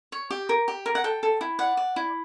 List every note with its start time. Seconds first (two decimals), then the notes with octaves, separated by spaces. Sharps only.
0.12 C#5
0.31 G4
0.49 A#4
0.68 G4
0.86 A#4
0.95 F#5
1.04 A4 G5
1.23 A4
1.41 E4
1.59 D5 F#5
1.77 D5
1.96 E4